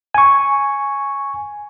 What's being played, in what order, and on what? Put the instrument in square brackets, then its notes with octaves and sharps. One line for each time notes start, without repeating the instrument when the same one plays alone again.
[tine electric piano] G#5 C#6